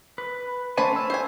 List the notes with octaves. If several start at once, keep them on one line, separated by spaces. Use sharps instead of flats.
B4
A3 C#4 C5 G#5 A5 B5
C#4 E6
C5 G#5